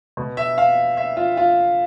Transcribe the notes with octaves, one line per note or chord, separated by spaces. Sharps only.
B2
E5
F5
E5
F4
F4